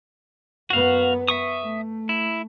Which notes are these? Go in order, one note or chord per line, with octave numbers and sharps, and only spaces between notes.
F#2 B3 F#4 F5
E5 C#6 D#6
A3
E4